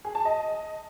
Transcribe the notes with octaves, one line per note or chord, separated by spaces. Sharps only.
G#4
A5
D#5